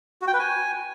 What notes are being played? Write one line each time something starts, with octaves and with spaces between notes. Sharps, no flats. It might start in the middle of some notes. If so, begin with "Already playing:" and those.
F#4
G5
B4
G#5